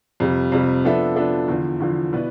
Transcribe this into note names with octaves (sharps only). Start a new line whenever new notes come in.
F2 C3 G3
F2 C3 G3
F3 B3 D4 A4 E5
F3 B3 D4 A4 E5
E2 D3 F3
E2 D3 F3
B2 B3 E4 B4 D5